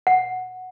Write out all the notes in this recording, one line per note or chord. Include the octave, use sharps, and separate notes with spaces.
F#5